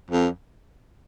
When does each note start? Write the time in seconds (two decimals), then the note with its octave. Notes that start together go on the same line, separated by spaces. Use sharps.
0.10 F2